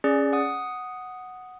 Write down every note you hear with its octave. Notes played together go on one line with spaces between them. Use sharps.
C#4 G#4 D5
F#5 D#6